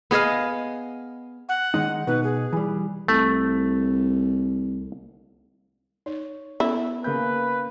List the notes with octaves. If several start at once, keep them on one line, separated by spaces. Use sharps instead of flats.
B3 G#4 D#5 F5
F#5
D#3 G#3 D#4
B2 D#4 B4
G#4
E3 G3
C2 A3
D#4 C#5
B3 C#4 E4 A4
C#3 A#3 B4 G6